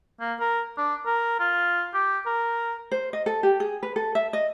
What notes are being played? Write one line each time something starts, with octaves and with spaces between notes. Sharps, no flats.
A#3
A#4
D4
A#4
F4
G4
A#4
C5
D#5
A4
G4
G#4
B4
A4
E5
D#5